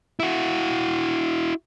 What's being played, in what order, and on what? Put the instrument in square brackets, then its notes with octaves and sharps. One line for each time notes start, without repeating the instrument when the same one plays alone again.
[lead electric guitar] E4 F#4